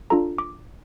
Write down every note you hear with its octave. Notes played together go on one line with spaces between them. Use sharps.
D4 F4 A4 A#5
D6